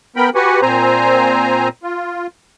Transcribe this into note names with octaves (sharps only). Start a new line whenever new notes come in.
B3 A#4 G5 B5
F#4 G4 B4 F#5 G#5
A#2 C4 C5 G#5 A#5
F4